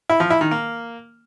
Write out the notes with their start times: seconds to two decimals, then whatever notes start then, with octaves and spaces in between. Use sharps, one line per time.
0.09 E4
0.20 F3
0.30 E4
0.41 D#3
0.51 A#3